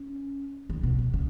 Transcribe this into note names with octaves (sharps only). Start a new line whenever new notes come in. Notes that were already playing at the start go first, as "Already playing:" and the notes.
Already playing: C#4
D#3
B2
B2
C#3